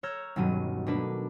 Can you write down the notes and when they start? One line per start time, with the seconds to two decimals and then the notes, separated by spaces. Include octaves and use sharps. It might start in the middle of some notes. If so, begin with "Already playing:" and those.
0.03 C#5 A#5 E6 F6 G6 G#6
0.36 D#1 G2 B2 F#3 D#7
0.87 B2 A3 A#3 D4 B4